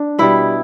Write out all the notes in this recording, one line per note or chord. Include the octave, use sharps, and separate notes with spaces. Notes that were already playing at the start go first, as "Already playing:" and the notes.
Already playing: D4
B2 G3 E4